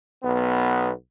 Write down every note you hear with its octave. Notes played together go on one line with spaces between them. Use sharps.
B1 B3